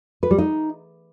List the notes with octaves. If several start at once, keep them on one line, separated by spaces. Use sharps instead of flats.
B4
G3
D#4